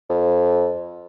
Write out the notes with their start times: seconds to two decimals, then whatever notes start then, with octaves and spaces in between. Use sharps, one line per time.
0.09 F2